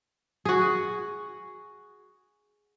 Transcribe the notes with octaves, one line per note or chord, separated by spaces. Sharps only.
F#4 G#4